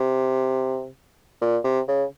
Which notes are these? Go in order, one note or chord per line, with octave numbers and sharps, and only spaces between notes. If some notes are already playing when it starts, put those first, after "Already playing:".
Already playing: C3
A#2
C3
C#3